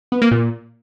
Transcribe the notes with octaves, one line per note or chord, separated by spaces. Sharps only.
B3
A#3
A#2